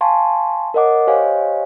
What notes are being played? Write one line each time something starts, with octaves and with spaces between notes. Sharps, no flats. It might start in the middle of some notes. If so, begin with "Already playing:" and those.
F5 G#5 A5 C6 C#6
A#4 C#5 D#5 F#5 D6
G4 C5 C#5 D#5 F5 G#5